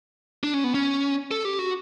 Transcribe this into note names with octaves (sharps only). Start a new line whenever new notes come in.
D4
C#4
B3
C#4
A4
G4
F#4